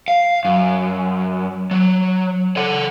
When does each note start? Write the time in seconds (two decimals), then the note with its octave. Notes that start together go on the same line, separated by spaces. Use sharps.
0.08 F5
0.45 F#2
1.71 F#3
2.57 A4 F#5